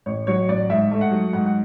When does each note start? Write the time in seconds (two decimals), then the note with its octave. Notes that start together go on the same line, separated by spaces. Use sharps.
0.06 A1 C#5
0.27 F#3 C#5
0.48 A1 D5
0.70 G#2 E5
0.91 A3
1.01 F#5
1.11 F#3
1.33 G#2 F#5
1.46 F#5